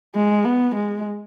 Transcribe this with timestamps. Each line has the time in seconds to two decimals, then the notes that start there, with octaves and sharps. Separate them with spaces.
0.15 G#3
0.45 B3
0.75 G#3